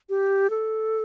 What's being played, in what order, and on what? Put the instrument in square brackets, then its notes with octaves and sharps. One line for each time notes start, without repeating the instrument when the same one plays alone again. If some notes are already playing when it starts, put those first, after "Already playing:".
[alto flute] G4
A4